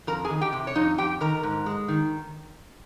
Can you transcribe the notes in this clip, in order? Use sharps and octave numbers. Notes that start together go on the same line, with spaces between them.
F2 A#4 A#5
G#4 G#5
D#3
G4 G5
C3
C#5
F2 D#4 D#5
F2 G4 G5
D#3 A#4 A#5
G#2
G#3
D#3